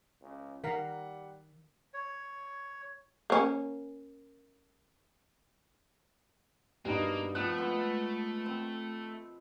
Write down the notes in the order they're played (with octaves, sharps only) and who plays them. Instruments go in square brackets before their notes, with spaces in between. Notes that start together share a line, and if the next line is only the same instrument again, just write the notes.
[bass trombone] C#2
[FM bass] D#3 [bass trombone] G3 [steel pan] A#4 F5 A#5 [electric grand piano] F#5 B6 C7
[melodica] C#5
[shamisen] A#3 C#4
[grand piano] G2 D#4 [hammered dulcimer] B2 C5 D#5 [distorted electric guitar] A#3
[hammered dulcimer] F3 B3 C4 [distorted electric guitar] A3 [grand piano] F#6
[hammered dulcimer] G#3 B3 C5
C4